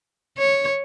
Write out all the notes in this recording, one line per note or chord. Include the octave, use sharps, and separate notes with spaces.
C#5